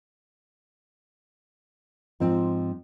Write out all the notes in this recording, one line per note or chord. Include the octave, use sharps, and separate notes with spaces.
G#2 F3 C4